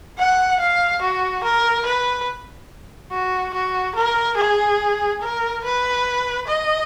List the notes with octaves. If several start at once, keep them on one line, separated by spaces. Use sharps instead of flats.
F#5
F5
F#4
A#4
B4
F#4
F#4
A#4
G#4
A#4
B4
D#5